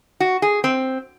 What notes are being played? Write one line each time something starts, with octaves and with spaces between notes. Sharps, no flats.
F#4
G#4
C4